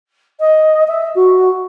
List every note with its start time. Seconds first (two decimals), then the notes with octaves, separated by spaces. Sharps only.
0.40 D#5
0.88 E5
1.15 F#4